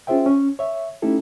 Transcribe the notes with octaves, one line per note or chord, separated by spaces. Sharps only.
C#4 F4 G#4 C5 E5 G5
C#4
C#5 E5
A3 C#4 D#4 E4 G4 A4